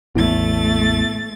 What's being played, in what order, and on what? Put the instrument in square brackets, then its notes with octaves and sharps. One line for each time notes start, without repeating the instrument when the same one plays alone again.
[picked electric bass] A1 E2 [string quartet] A3 A6 [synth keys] B3 E4